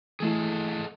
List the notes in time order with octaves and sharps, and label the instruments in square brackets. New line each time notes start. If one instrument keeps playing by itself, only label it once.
[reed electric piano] E3 A3 E4 [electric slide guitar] G#4 A4 D#5